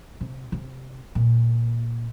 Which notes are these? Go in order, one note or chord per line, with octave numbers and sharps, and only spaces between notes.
C3
C3
A#2